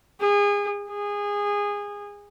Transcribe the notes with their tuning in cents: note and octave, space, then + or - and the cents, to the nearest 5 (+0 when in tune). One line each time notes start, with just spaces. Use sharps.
G#4 -30
G#4 -20